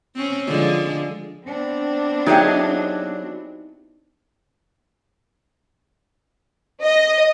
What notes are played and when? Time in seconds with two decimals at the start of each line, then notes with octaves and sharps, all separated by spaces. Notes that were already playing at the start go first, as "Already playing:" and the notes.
0.15 C4 C#4
0.47 D3 F3 G#3
1.49 B3 C4 D4
2.26 F#3 D#4 E4 G4 G#4 D#5
6.83 D#5